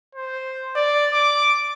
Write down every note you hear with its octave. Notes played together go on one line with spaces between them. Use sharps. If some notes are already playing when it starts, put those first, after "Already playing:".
C5
D5
D6